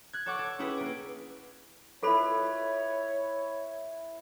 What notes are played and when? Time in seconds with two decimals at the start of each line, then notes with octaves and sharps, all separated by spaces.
0.13 F#6 G#6
0.26 A4 C#5 F#5 C#6 D6
0.38 A4 C#6
0.59 C#4 E4 G4 G#4 B4
0.77 A#3 D7
2.03 E4 F4 A4 B4 C#5 B5